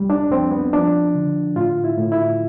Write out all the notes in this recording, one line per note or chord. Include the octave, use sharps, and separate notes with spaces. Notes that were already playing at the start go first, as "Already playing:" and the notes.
Already playing: C2 G3
D4
F2 C4
B3
F3 D4
D3
A2 F4
E4
A2
E4